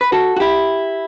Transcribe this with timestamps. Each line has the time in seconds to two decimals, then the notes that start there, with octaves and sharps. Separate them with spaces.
0.01 B4
0.12 F#4 A4
0.37 F#4
0.40 E4 G4